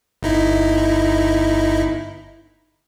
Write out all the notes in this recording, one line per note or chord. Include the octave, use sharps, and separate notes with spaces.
G1 D#4 E4